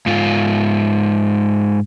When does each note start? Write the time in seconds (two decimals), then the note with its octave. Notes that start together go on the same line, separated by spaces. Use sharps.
0.06 G#2 F4